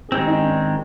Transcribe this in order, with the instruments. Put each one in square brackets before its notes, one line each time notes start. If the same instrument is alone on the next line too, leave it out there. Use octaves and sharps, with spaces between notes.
[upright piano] G#4
[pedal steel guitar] D#3 G#3 C4 [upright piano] G4
[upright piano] D#4
D4